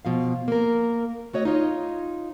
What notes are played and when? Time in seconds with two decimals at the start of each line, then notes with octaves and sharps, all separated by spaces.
0.05 B2 F3 F5
0.48 A#3 A#4
1.33 A3 F#4 C#5 D#5
1.45 D#4 F4 C#5 D#5